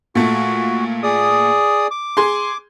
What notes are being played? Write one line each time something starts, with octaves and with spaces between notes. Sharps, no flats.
A#2 A3 F#4
G#4 D5 D#6
D6
G#4 C6